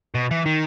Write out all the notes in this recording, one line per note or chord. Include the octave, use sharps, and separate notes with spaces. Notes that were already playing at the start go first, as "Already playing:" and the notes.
B2
E3
D#3